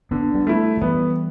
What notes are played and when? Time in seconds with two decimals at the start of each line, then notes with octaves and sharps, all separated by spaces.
0.11 D3 B3 D4
0.34 G3 B3
0.47 A3 E4
0.77 F3
0.81 E3 G3 B3